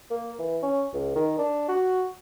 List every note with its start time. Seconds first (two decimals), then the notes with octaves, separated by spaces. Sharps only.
0.11 A#3
0.39 E3
0.63 C#4
0.94 C#2
1.16 D#3
1.39 D4
1.69 F#4